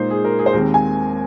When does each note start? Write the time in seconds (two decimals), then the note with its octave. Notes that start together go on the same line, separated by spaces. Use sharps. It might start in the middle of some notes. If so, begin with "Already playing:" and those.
Already playing: A#2 G#3 D#4 C5
0.10 G#4
0.24 A#4
0.39 G#4
0.46 C5
0.53 D#2 D#3 G#3 C4 A#4
0.74 G#5